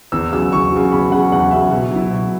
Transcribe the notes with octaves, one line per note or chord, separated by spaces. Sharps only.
E2 E6
C#3 F#3 E6
E2 C#6
C#3 F#3
E2 B5
C#3 F#3 F#5
E2 F#5
C#3 F#3 E5
B2
F#3 E4
B2